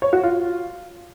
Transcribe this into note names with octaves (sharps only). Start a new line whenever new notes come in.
C#5
F#4
F4